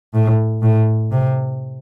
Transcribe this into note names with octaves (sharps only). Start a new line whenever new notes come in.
A2
A2
C3